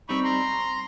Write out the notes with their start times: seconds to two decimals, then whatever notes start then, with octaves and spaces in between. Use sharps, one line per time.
0.09 G3 C4 D#4 B5 C#6
0.24 A#5 C6